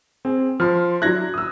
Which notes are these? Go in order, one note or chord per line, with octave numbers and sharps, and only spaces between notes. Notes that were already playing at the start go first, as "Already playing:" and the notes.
C4 G#4
F3 C6 F6
F#3 D4 E4 F#6 G#6 A#6
D#6 E6